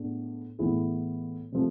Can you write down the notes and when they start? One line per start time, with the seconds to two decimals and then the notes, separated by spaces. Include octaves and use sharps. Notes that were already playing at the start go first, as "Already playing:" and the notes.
Already playing: A2 G#3 B3 D4
0.59 A2 E3 B3 E4 G#4
1.52 C3 F3 A3